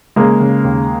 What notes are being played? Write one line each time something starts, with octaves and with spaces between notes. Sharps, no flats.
C#3 G#3 A#3
C#3
D#2